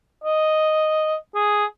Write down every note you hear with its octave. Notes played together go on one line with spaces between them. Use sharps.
D#5
G#4